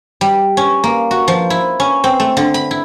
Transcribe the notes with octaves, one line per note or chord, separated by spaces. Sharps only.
G3
C#4
A#3
F#4
F3
E4
C#4
C4
A3
D3
B5
E4